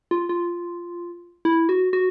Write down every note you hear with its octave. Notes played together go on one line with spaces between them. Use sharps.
F4
F4
E4
F#4
F#4